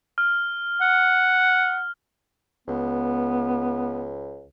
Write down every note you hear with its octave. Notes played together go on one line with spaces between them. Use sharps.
F6
F#5
C#2 B3